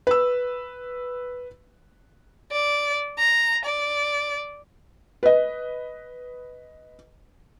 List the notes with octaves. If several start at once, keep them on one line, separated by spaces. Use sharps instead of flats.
B4 E6
D5
A#5
D5
B4 D#5